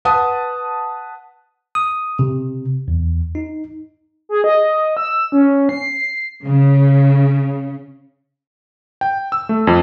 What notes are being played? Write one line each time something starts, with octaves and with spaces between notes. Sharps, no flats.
B4 F#5 A5 D#6
D#6
C3
E2
D#4
G#4
D#5
E6
C#4
C7
C#3
G5
E6
A3
F2